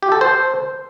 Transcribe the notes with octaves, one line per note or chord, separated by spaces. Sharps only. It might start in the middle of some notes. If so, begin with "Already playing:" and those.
G4
A4
C5